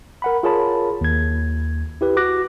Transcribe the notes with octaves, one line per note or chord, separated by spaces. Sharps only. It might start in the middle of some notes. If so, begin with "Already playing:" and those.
A#4 F#5 B5
F4 G#4 A#4 C#5 A5 B5
D#2 G#6
E4 G4 B4
F#4 D6 F#6 A#6